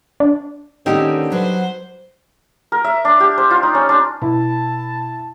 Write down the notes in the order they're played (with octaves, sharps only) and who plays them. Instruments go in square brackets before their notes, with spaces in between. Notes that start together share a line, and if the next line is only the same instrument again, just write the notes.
[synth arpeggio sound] D4
[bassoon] D3 [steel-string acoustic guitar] D#3 A#3 C#4 [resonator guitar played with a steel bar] C4 D#4 G4
[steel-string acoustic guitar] F#3 F#4 B4 [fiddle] C5
[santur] A#4
E5
D4
G4
C5
F4
D#4
C#4
D4
[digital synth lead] B2 [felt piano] E4 [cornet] A5